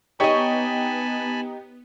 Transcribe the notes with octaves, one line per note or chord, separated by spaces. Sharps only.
B3 D#4 G4 C#5 D#5 G#5 A5 B5